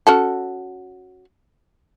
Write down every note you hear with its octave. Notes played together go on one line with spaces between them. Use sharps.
C#4 F#4 A4